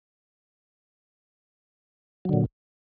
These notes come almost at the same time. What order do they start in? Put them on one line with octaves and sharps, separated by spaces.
F#3 D3 A#2